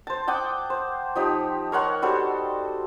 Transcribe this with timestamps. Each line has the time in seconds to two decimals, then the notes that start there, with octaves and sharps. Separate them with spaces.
0.07 C5 A5
0.27 F#5 G5 D6 D#6
0.70 C5
1.16 F3 D#4 G4
1.72 A#4 C#5 F#5 C6
2.02 G3 F#4 A4 C5